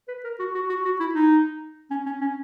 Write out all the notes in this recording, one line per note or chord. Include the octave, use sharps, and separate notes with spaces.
B4
A#4
F#4
F#4
F#4
F#4
E4
D#4
C#4
C#4
C#4